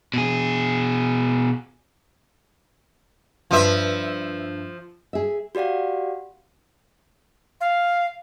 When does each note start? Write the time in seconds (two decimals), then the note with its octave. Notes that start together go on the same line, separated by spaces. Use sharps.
0.14 B2 G#4
3.51 G2 F3 B4 E5
5.13 G#4 E5
5.55 F#4 G4 D5 F5 F#5
7.61 F5